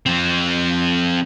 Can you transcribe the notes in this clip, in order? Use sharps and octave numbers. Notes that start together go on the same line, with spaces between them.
F3 C4